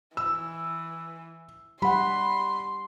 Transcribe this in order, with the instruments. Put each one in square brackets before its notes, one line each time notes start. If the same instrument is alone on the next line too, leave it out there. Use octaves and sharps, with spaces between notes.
[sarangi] E3 [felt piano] E6
[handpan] G3 F#5 [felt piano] B5 [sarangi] C6